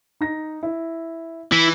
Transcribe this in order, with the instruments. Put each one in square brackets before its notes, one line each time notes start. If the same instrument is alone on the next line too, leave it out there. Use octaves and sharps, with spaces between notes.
[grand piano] D#4 A#6
E4
[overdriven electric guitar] E3 [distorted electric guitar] E4